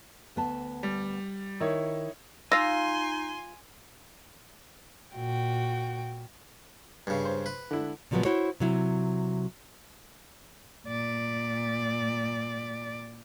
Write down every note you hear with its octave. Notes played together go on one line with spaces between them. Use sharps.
D2 B3 A5
G3
D#3 D#4 E4 C#5
D#4 F4 F5 G#5 C6 E6 A#6
A#2 F#4 G5
G2 C#3
C5
B4
D3 E4
A#2 C#3 F3 F#3 G#3 B3
E4 F#4 C5 C#5
C3 F#3 E4
A#2 D5